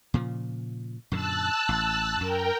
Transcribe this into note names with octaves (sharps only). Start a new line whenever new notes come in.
A#2 C#3 F3
F#2 A#2 D3 A5 E6 F#6
A1
F#2 A#4 G5